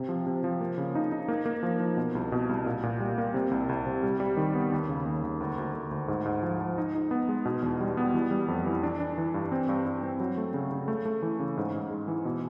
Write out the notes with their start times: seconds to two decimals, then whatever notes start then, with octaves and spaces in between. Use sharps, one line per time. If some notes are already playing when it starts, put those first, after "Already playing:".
Already playing: C3
0.09 F3
0.27 C3
0.44 F3
0.61 A#3
0.78 C#3
0.95 D#4
1.12 D#4
1.28 A#3
1.46 A#3
1.63 F3
1.80 F3
1.97 B2
2.15 C2
2.32 B2
2.49 C2
2.66 A#2
2.83 A#2
3.00 G3
3.18 A#3
3.34 C3
3.51 C2
3.69 C2
3.86 C3
4.03 G3
4.20 G3
4.37 D#3
4.55 B3
4.72 D#2
4.89 C#3
5.06 D#2
5.23 D#2
5.40 D2
5.58 D2
5.74 D2
5.91 D2
6.08 G#2
6.25 G#2
6.43 F3
6.61 F3
6.78 D#4
6.95 D#4
7.11 B3
7.29 G#3
7.45 B2
7.62 E2
7.81 G3
7.97 B3
8.14 E3
8.31 G3
8.48 F2
8.66 E3
8.83 D4
9.00 D4
9.18 E3
9.34 G2
9.52 C4
9.69 G2
9.86 G2
10.03 C4
10.20 F#3
10.37 A3
10.54 C#3
10.72 C#3
10.88 A3
11.05 A3
11.22 E3
11.40 C#3
11.57 G#2
11.74 G#2
11.91 G#3
12.08 E3
12.25 B2